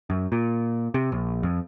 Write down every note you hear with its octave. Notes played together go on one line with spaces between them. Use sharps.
F#2
A#2
C3
A#1
F2